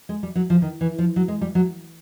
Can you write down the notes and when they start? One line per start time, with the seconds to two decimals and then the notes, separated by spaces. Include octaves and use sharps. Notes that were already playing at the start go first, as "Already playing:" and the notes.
0.09 G#3
0.23 G3
0.35 F#3
0.50 F3
0.62 D#3
0.81 E3
0.98 F3
1.16 F#3
1.28 G#3
1.41 G3
1.55 F#3